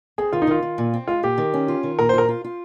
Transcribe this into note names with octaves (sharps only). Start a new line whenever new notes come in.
C4 G#4
D#3 F4
D#4
D#3 F4
D#3
A#2
C4
G#3 F4
A#2 G4
D#3
C#4
F4
D#3
A#2 A#4
C5
F4 A#4
F4
F4